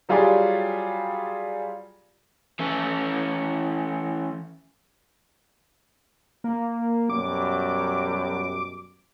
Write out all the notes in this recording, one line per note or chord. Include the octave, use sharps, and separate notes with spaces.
F#3 G3 F4 G4 G#4 D5
E3 C#4
A#3
F#2 B2 G3 D6